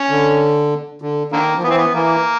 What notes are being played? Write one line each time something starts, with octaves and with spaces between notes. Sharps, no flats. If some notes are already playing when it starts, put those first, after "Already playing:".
Already playing: C#4
D3
D3
D3 D#3 A#3
F3
E3 B3
C4
B3
E3 A#3